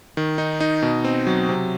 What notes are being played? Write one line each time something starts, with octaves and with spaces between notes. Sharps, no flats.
D#3
D#4
D#4
B2
C4
F#3
C3